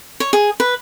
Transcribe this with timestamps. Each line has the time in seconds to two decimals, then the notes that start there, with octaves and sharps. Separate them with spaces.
0.20 C#5
0.33 G#4
0.60 B4